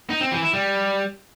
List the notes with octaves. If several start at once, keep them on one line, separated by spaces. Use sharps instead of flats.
D#4
C4
E3
E4
G3